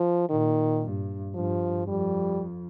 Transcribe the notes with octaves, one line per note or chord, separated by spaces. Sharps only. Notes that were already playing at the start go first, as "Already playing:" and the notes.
Already playing: F3
A#2 D#3
G2
G2 F3
F2 G3